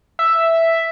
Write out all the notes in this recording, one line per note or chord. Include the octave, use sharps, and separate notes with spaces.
E5